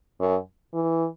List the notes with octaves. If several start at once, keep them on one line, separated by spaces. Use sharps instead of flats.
F#2
E3